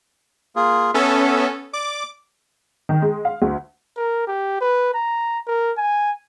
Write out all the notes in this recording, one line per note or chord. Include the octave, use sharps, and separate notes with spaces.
A#3 F4 G#4
B3 C#4 A4 E5
D5 D6
D#3
G#3
F5
D2
A#4
G4
B4
A#5
A#4
G#5